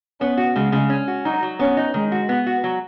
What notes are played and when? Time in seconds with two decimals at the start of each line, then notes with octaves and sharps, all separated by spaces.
0.20 B3 C#4
0.37 F#4
0.55 C#3 G#3
0.72 C#3
0.90 C#4
1.08 F#4
1.25 F#3 D#4
1.43 F#3
1.59 B3 C#4
1.77 D#4
1.94 D#3 G#3
2.12 F#4
2.29 B3
2.47 F#4
2.64 F#3